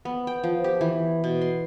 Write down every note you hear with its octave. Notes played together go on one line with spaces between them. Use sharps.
B3
G5
F3
G4
E3
B2
C6